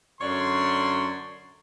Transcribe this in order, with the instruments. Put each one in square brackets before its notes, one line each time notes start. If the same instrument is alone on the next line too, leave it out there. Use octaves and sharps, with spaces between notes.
[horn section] F#2 D3 C#5 D5 C6